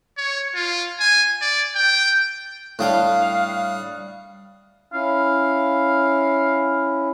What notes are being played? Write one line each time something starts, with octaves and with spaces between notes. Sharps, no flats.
C#5
F4
G#5
D5
G5
A2 G3 D4 F5 G5 D#6 F#6
C#4 E4 F5